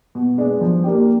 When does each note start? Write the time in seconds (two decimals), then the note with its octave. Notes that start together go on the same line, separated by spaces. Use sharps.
0.15 B2
0.38 G#3 B3 D4
0.61 F3
0.84 A#3 D4 G4